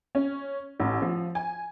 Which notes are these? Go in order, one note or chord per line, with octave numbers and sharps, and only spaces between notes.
C#4
A1
F3
G#5